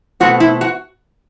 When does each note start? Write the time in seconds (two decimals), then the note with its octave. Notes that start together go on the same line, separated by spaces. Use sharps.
0.20 B2 A3 C4 F#4
0.40 E4
0.61 F#4